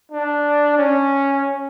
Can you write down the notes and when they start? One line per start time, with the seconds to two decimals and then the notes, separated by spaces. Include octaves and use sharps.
0.12 D4
0.78 C#4